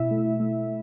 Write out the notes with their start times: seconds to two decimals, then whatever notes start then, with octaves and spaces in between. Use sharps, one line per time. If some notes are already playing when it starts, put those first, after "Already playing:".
Already playing: B2 E4 E5
0.11 A3
0.40 A3